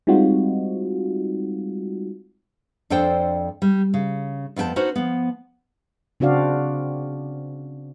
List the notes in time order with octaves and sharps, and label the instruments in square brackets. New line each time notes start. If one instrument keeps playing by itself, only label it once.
[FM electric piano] G3 G#3 C4 D#4 F4 F#4
[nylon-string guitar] F2 D4 A4 C5 D5 G5
G3
C#3
F2 B3 F#4 G5 A5
C#4 D#4 F#4 B4 C5
F3 B3
[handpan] C#3 C4 D4 F#4 D5 F5